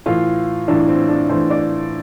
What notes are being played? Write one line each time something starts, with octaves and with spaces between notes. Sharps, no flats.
A2 E3 F4
A2 E3 D4
C4
D4
A2 E3 C5
D5